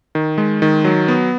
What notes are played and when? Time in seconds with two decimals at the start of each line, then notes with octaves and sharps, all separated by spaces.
0.15 D#3
0.38 G#3
0.62 D#3
0.85 F#3
1.08 B3